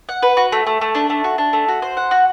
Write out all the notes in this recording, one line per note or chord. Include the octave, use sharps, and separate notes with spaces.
F#5
B4
F#4
A3
A3
A3
D4
A3
F#4
D4
A3
F#4
C5
F#5
F#4